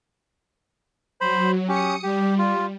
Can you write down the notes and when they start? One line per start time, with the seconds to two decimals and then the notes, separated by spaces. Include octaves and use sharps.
1.21 F#3 C5 B5
1.69 C#4 G4 D#6 C#7
2.03 G3 G4
2.38 F4